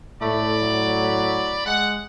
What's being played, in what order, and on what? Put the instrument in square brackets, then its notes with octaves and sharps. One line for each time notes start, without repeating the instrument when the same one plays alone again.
[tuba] A2 [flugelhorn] A3 [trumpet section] D5 B5
[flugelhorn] F#3
[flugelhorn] G#3 [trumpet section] F#5